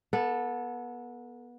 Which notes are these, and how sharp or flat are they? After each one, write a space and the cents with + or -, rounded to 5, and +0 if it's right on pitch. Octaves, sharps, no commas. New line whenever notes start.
B3 -25 A4 +0